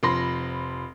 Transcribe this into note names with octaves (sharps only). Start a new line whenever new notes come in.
F1 F3 B5 C6 A#6